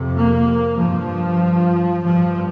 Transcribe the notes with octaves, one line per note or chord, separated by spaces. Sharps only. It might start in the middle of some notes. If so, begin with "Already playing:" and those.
Already playing: F2 C3
A#3
G2 F3
G2 F3